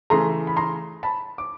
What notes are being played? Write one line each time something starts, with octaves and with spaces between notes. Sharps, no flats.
C#3 E3 A3 A#5 C6
B5
A#5 C6
A5 B5
D6